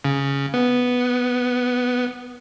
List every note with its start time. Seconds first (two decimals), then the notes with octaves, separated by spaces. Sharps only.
0.04 C#3
0.54 B3